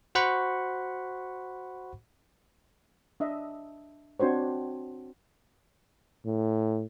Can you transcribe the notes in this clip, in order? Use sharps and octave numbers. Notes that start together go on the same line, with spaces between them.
F#4 C5 F#5 B5 C#6
D4 D#5 E5
C4 D4 F#4 C5 C#5
A2